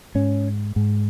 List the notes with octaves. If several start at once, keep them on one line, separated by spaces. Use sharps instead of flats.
G#2 C#4
G#2